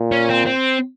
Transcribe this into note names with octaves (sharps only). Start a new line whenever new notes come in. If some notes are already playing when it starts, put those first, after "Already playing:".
Already playing: A#2
C#4
C4
C4